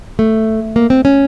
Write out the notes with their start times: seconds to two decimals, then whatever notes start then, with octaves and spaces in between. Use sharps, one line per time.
0.19 A3
0.76 A#3
0.90 C4
1.05 C#4